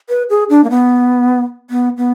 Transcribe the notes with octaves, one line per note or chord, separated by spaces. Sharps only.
B4
G#4
D4
A#3
B3
B3
B3